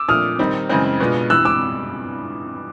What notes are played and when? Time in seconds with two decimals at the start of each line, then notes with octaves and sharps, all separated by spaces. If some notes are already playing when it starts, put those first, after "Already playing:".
Already playing: D6 E6
0.08 A#2 F3 A3 D4 F4 D#6 F6
0.39 D#3 G3 C4 D#4
0.69 F#2 C#3 E3 G#3 C4
1.00 B2 G#3 B3 D4 F4
1.30 G2 E3 G3 E6 F#6
1.45 D6 E6